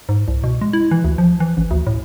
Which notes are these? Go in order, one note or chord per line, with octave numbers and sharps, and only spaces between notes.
G#2
C2
B2
G#3
E4
E3
D2
F3
E3
A1
D2
A2